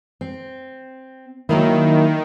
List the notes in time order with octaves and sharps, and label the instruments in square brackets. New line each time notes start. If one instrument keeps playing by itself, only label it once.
[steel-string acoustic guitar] C4
[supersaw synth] D#3 [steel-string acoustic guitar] F#3 A#3 E4